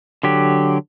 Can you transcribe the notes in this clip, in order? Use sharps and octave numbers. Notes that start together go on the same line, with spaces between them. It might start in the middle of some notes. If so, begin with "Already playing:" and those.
D3 F#3 G4